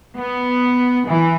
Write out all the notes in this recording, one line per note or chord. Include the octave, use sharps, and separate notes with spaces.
B3
E3